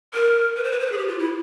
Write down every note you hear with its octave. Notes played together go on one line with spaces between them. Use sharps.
A#4
B4
C5
B4
C5
B4
G#4
G4
F4
E4